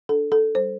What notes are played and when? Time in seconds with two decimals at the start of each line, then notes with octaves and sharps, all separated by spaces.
0.09 D4 A4
0.32 A4
0.55 G3 C5